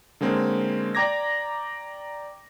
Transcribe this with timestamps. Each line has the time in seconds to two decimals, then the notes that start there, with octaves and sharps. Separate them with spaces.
0.21 D3 G#3 A#3 C4 C#4
0.95 D5 G5 A#5 D6 G#6 A#6